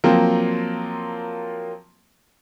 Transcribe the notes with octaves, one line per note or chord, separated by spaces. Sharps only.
F3 F#3 A#3 C4